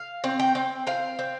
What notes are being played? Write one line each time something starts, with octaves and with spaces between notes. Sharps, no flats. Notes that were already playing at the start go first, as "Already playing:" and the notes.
Already playing: F5
C4
G5
C4
C4 F5
C4